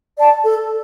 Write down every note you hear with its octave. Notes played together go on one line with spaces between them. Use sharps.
D5 A5
A4